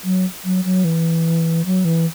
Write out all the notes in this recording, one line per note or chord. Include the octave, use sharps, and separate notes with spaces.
F#3
F#3
F#3
E3
F#3
E3